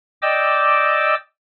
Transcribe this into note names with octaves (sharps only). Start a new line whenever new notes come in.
D5 D#5 G5 D6 E6